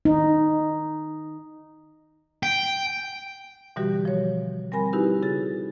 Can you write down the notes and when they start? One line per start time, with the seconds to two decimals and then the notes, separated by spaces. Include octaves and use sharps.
0.05 D#4
2.43 G5
3.76 B2 D3 E3 G3 F#4 G4
4.05 F3 C#5
4.72 G3 C4 A#4 G#5 B5 A#6
4.93 D#4 E4 F#4 G4 B4
5.22 C#3 F#4 G#4 A6